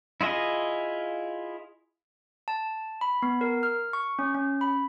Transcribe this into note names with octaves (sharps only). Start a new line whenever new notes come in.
E4 F4 G#4 D#5
A5
B5
B3
A#4
F6
C#6
C#4
C#4
B5